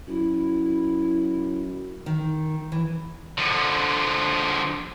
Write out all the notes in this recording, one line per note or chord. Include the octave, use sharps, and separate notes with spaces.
F#2 E4
D#3
E3
D3 F3